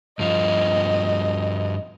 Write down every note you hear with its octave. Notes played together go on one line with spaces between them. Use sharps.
G2 F3 D#5